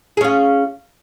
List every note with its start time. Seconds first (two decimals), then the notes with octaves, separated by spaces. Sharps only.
0.17 G#4
0.21 C#4
0.24 F4